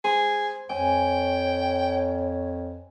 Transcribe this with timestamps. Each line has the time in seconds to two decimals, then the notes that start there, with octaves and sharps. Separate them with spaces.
0.04 G#4 C5
0.70 F2 C#5 G5 G#5